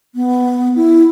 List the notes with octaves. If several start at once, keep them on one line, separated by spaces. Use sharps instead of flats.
B3
E4